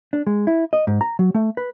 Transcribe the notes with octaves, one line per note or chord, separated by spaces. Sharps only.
D4
G#3
E4
D#5
G#2
A#5
F#3
A3
B4